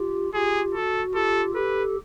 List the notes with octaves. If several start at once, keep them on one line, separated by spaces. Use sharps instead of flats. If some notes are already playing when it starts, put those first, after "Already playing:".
Already playing: F4 G4
F4 G4 G#4
F#4 A4
F4 G4 A4
G4 A4 B4